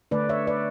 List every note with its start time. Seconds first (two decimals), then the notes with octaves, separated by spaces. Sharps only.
0.11 D3 A3 D4 B4 D5
0.29 C#5 E5
0.47 B4 D5